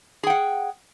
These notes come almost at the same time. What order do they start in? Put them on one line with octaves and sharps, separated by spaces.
G#4 G5 F#5